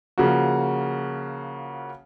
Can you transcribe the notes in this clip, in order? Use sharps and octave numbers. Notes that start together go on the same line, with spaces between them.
C#3 F3 A#3 F#4